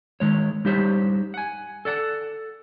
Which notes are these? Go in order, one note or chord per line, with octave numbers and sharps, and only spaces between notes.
D#3 G#3 C#5
G3 D#4 G4 C5 C#5
F#5 G#5
A4 D5 F#5 A5